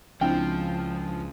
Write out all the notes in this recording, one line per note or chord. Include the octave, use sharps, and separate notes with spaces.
C#2 F3 C4 D4 E4 G5